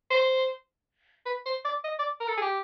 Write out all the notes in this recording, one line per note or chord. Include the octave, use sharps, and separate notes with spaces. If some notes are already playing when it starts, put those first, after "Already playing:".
C5
B4
C5
D5
D#5
D5
A#4
A4
G#4
G4